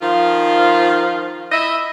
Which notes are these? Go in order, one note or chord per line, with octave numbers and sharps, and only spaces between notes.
D#3 F3 F4
E4 D#5 E5